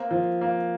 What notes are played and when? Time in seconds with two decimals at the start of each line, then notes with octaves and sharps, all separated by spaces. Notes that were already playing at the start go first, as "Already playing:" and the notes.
Already playing: A#3 C4
0.11 F3
0.41 A#3